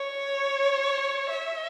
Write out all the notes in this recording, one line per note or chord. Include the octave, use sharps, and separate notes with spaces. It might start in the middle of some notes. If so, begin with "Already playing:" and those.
Already playing: C#5
E5